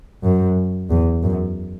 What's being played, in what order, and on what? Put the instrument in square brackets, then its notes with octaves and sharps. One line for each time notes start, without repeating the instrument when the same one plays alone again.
[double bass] F#2
E2
F#2